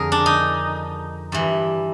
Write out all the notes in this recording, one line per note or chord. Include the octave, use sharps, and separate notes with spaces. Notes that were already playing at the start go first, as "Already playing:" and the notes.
Already playing: F2 D3 G#4 A#4
D4
D#4
G2 E3